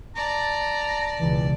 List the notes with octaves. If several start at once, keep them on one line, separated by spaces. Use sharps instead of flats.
D5 A5 A#5
C#2 B2 E3